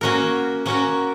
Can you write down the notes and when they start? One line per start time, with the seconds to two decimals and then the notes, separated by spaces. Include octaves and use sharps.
0.01 A#3 C#4 F#4 A#4
0.66 A#3 C#4 F#4 A#4